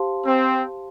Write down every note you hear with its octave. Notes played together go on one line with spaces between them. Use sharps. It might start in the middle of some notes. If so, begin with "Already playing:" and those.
Already playing: G4 C5 F5 A5 C6
C4